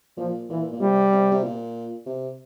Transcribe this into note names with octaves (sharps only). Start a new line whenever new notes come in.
A#2 F3
A#2 E3
A#2
C3 G3
C3
C3
A#2
C3